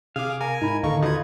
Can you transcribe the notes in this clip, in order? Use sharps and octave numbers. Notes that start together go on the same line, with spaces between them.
C3 G#4 F5 D6
A#4 F5 G#5
G#2 D#4 E4 B5 G#6
D#2 A2 D3 D#3 A4 D#5 F5 C#6
D#4 F4 F#4 B4 G#6